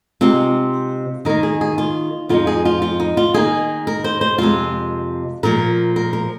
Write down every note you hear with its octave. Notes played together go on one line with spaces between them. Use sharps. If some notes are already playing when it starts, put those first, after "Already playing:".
C3 G#3 C4 D#4 F4
D#3 A#3 D#4 A#4
G#4
G#4
F4
F2 F3 G#3 D#4 F4
G#4
F4
F4
D#4
F4
D#3 A#3 D#4 G#4
A#4
C5
C5
F2 C3 G#3 F4
A#2 F3 A#3 A#4
A#4
A#4